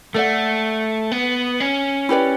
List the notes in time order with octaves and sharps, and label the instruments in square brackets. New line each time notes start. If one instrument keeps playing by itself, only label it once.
[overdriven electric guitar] A3 [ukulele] A4 D5 F#5
[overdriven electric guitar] B3
C#4
[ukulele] E4 G4 B4 D5